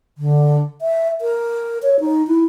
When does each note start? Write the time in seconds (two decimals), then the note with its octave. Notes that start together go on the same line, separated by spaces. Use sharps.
0.18 D3
0.82 E5
1.21 A#4
1.83 C#5
2.00 D#4
2.27 E4